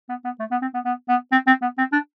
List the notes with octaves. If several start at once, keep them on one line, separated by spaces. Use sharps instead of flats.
B3
B3
A3
B3
C4
B3
B3
B3
C4
C4
B3
C4
D4